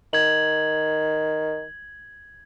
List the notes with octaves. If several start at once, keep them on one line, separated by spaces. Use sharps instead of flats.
D#3 G#6 F#7